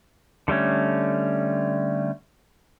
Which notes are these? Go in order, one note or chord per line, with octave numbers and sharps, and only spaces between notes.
D3 G3 A3 C#4